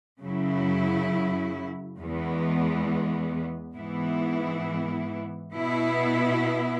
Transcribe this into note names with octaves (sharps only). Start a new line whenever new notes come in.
F#2 C#3 F#3 E4
E2 E3 G#3 B3
G#2 E3 B3 E4
B2 B3 E4